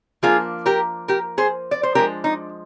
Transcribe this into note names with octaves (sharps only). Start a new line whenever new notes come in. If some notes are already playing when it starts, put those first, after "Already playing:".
F3 A#3 D4 F4 G#4
G4 A#4
G4 A#4
G#4 C5
D5
C5
F3 G#3 D4 G4 A#4
D#4